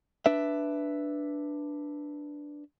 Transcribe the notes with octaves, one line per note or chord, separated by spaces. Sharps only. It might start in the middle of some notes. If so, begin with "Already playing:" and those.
D4 B4 E5